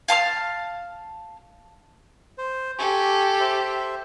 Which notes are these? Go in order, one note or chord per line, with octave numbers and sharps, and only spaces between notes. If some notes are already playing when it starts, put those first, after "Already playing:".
F5 A5 C6 F6
C5
G4 A4 G#5 C#6
C5 E5